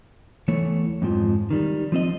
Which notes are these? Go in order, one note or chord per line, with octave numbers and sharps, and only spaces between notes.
E2 E3 A3 C#5
F2 G#2 F3
D#3 G3
F3 C4 D#5